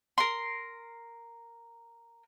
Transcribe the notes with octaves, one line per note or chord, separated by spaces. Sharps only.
A#4 C6